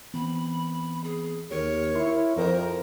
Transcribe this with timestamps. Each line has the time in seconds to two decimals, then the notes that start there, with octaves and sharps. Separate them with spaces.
0.14 E3 B3 C4 B5
1.04 G#4
1.51 D#2 G4 A#4 C#5
1.95 E4 C6 C#6
2.36 F2 A#4 C5